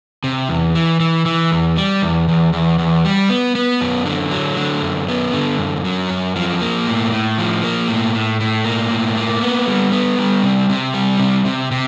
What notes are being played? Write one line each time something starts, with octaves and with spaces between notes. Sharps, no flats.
C3
E2
E3
E3
E3
E2
G3
E2
E2
E2
E2
G3
B3
B3
F#2
D3
F#3
D3
F#2
B3
D3
F#2
F#3
F#2
F3
A#3
A2
A2
F3
A#3
A2
A2
A2
A#3
A2
A#3
B3
G3
B3
G3
C3
C3
G3
C3
C3
C3